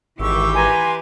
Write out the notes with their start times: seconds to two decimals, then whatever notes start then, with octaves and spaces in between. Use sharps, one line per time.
0.19 G#1 E3 G4 C#6 E6
0.55 B4 G#5 A#5 C6